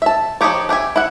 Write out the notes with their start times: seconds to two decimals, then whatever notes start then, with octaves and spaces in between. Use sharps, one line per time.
0.02 E5 A5
0.41 F3 A3 D#4 G4 C#5
0.69 D4 G4 E5 G#5
0.96 E4 F#5